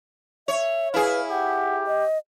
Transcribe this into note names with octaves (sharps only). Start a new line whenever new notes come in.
C#5 E5
E4 G#4 B4 F5
G4 F#5
D#5